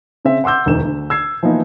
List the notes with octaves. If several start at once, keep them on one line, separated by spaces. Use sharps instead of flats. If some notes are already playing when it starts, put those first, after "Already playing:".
C#3 C4 E5
F#5 C6 D6 E6 G6
E1 D2 D#3 E7
D2
E6 G#6 C7
E3 F3 A#3 B3 D#4